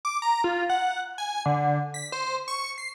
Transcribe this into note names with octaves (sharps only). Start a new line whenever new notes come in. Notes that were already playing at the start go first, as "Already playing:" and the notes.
D6
A#5
F4
F#5
G#5
D3
B6
C5
C#6
C7